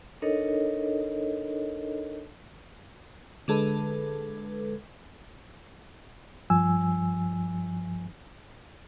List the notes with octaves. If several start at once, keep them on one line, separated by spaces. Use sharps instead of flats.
D4 D#4 A4 A#4 C#5 D#5
D3 G#3 A4 B4
G2 F3 G#5 E6